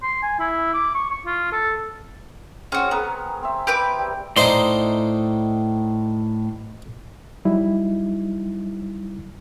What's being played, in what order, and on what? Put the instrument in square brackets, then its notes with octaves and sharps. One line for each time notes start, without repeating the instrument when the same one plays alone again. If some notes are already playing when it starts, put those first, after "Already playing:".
[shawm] C6
G#5
E4
D6
C#6
C#6
F4
A4
[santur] C4 G#4 C#6 [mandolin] C#4 F#4
[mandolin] B3 [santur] G#4 A#4 A#5
[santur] C4 E5
[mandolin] G4 B4 D6
[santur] G3
[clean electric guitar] A2 C6 [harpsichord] D#4 C5 D5
[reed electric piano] F#3 G3 D#4 E4